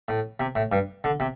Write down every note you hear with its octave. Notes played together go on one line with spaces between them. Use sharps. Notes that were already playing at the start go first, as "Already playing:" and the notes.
A2
C3
A2
G2
D3
C3